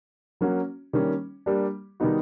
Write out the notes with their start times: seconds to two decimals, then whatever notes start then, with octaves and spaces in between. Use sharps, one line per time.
0.41 F#3 A#3 C#4 F#4
0.93 D#3 G3 A#3 C#4
1.46 G3 A#3 D4 G4
2.00 D#3 G3 B3 D#4 F#4